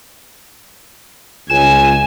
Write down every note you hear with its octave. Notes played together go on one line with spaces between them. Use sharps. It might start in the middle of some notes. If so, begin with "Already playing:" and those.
C#2 G#5 E7